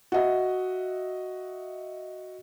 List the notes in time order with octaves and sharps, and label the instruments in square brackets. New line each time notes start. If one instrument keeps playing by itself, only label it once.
[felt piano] F#4 D#5 E5